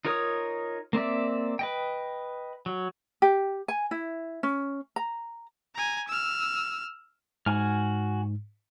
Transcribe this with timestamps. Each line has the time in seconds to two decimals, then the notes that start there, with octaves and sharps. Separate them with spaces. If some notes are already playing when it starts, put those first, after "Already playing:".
0.05 D#4 F4 A#4 C#5 D#6
0.93 A#3 C4 D5 E5
1.59 B4 D#5 G5
2.66 F#3
3.22 G4
3.68 G#5
3.91 E4
4.43 C#4
4.96 A#5
5.74 G#5 A#5
6.08 E6 F6
7.46 G#2 F#4 G#5 F6